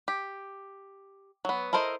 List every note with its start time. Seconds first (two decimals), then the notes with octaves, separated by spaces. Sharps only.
0.08 G4
1.45 F#3 B3
1.73 E4 A4 A#4 C5 D#5